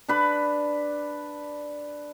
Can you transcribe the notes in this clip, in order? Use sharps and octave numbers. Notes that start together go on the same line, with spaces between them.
D4 B4 B5